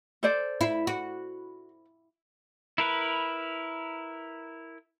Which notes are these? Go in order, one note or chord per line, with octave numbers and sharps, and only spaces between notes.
A4 C5 D5
E4
F#4
E4 A#4 B4